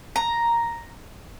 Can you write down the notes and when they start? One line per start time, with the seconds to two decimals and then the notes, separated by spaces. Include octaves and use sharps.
0.16 A#5